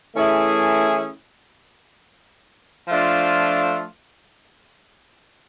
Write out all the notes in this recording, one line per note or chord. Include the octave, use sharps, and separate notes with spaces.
E3 A3 C#4 E4 G#4
F3 A3 D4 F4